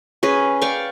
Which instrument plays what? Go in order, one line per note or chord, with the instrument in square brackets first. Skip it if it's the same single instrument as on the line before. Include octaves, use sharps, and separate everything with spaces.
[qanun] C#4 G#4 B4
D5 F5 G5 C#6